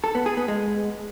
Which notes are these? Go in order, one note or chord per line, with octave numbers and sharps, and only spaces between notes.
A4
B3
G#4
B3
G#3